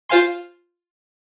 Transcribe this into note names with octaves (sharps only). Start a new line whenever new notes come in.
F4 C5 F5 G#5 C6